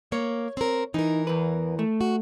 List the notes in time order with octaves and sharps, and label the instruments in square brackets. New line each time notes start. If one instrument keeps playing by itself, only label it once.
[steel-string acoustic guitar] A#3 [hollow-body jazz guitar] C#5
[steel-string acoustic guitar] C4 A#4
[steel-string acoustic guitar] E3 A#4 [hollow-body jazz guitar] D#4
[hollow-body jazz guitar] E2 B4
A3
[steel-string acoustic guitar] F#4